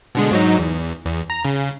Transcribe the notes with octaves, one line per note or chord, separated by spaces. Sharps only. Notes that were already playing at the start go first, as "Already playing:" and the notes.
B2 D3 G#3
G#2 F#3 D#4
E2
E2
A#5
C#3